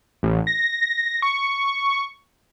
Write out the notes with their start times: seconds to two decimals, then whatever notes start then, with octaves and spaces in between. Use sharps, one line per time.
0.23 A1
0.47 A#6
1.22 C#6